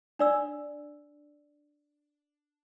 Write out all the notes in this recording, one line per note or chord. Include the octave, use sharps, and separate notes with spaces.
D4 D5 E6